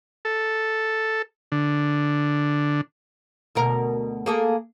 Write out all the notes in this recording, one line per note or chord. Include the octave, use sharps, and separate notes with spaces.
A4
D3
D2 B2 A#4
A#3 G#4 A4